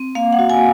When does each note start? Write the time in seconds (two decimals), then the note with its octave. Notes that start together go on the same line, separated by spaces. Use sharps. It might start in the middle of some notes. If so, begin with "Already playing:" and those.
Already playing: C4
0.15 A#3 F5
0.33 F#5
0.39 F#4
0.50 G#5